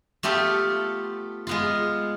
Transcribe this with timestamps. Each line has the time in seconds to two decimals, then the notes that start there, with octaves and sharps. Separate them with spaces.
0.23 A3 B3 F4 G4 A4
1.47 G#3 B3 F4